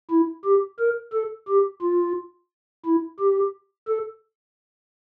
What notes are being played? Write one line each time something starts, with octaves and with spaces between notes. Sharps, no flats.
E4
G4
A#4
A4
G4
F4
E4
G4
A4